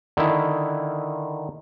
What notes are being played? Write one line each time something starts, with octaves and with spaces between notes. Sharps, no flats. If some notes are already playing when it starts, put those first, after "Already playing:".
D3 D#3 E4